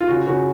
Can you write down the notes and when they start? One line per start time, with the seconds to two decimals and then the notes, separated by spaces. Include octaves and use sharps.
0.01 F4
0.08 C#3 F#4
0.27 C#3 F#4